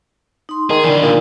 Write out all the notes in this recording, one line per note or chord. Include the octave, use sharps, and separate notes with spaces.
D#4 C6
D#3 G#4
D3 E3 D5
A#2 D#4